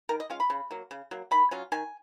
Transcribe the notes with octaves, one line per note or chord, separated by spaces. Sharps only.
D#3 A#4
D#5
G#3 C#4 F4 F5
B5
C#3
F#3 A#3
C#3
F#3 A#3
D#3 B5
F#3 C#4 F4
D#3 G#5